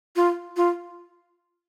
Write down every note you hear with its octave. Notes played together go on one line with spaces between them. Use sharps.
F4
F4